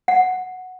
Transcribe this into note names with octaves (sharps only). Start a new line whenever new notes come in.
F#5